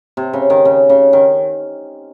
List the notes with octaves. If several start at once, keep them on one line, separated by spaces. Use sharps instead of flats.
C3
C#3
D#3
C#3
C#3
D#3